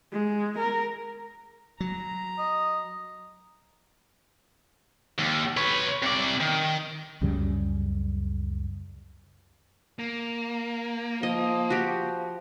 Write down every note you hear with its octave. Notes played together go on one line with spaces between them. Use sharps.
G#3
A#4
F#3 A#5
D#5
D#2
B4 C#5
C3 D5
D#3
C#2 F#2 C#3 G3
A#3
F3 D#5
F#4 G4